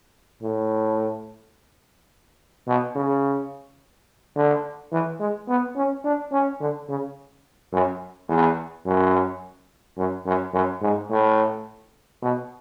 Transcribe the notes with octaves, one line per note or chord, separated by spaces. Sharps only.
A2
B2
C#3
D3
E3
G#3
B3
C#4
D4
C#4
D3
C#3
F#2
E2
F#2
F#2
F#2
F#2
G#2
A2
B2